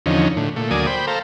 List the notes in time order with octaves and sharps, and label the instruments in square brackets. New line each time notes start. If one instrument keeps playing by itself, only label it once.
[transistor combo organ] E2 D3 F3 C#4 D#4
A2 D3
A#2 A3
D2 F#3 A#3 D5 G#5 D#6
C5 G5 B5
A4 C5 F5 A#5